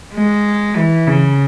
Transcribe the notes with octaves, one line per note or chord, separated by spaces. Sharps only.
G#3
E3
C#3